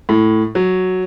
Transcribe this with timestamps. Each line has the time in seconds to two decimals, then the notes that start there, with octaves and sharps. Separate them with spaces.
0.09 A2
0.55 F#3